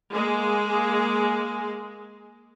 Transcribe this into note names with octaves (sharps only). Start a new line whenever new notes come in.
G#3 A#3 G#4